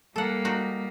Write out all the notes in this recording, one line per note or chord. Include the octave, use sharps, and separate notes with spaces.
G3 A#3 A4 F#5
D#4 F#4